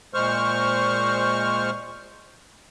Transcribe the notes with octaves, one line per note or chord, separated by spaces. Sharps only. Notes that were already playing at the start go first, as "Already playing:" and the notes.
A#2 G#3 C5 C#6 F6